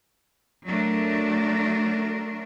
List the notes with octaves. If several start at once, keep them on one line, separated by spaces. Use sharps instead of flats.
F#3 A3 D4 A#4